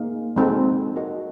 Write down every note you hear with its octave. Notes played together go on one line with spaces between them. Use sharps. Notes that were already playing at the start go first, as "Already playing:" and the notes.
Already playing: A#3 D#4 G#4 F5
G#3 C4 D#4 F#4 A4
F#4 A#4 D#5